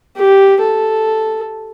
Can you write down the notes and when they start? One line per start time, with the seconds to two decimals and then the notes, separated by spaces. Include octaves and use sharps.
0.17 G4
0.61 A4